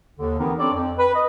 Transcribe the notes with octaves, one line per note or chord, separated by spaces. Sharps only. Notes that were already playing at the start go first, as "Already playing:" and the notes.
D#2 D3
E3 B3 C4 D#4 G4 A#4
C4 D4 A4 C#5 D5
F2
B4
D#5